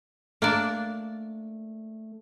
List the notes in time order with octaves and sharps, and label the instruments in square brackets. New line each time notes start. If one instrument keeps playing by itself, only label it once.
[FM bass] A3 [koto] A#3 D4 D5